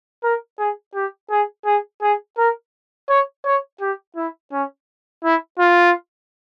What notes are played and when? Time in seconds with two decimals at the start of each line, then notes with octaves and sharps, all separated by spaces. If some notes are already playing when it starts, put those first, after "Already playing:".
0.23 A#4
0.58 G#4
0.94 G4
1.31 G#4
1.66 G#4
2.02 G#4
2.38 A#4
3.09 C#5
3.45 C#5
3.81 G4
4.16 E4
4.52 C#4
5.24 E4
5.59 F4